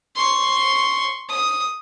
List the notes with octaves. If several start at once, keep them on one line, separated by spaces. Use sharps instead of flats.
C6 C#6
D#6